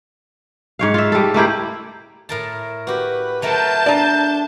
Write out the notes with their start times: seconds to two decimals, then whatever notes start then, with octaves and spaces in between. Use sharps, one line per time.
0.79 G#2 C#5 F5
0.94 F4 E5
1.12 G3 A4
1.34 A3 A#3 E4 G4
2.29 A2 A#4 A5
2.87 F#4 G4 B4
3.42 F#3 A3 A#4 A5 G6
3.86 D4 D5 A#5